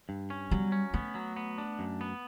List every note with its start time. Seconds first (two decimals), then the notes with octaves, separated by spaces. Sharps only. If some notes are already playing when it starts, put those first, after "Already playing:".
0.09 G2
0.30 C#4
0.51 F#3 G3
0.72 C#4
0.94 A3 B3
1.15 F#3
1.36 B3
1.58 D4
1.79 F#2
2.01 B3